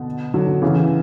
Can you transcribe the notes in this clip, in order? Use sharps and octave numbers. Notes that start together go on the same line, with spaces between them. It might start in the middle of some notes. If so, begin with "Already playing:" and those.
Already playing: B2 D3
D3 F#3
C#3 E3